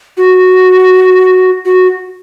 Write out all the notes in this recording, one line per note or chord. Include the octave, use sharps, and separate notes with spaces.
F#4
F#4